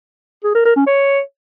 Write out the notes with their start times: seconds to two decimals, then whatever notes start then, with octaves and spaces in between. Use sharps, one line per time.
0.44 G#4
0.55 A#4
0.65 A#4
0.76 C#4
0.87 C#5